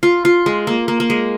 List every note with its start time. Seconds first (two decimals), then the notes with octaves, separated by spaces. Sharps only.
0.03 F4
0.25 F4
0.46 G#3
0.67 A#3
0.88 A#3
1.00 A#3
1.10 G#3